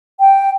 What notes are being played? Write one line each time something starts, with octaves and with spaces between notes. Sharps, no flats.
G5